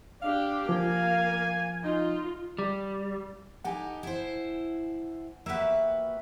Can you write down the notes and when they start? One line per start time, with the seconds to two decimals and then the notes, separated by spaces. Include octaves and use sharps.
0.22 D4 G4 F5
0.69 F3 A#3 G#5
1.84 D#4 F4
2.58 G3
3.65 D#4 G4 A4 F#5 G#5
4.03 E4 C5
5.46 A#3 F#4 G4 B4 E5